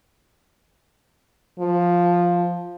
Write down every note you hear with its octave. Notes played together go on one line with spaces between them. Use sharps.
F3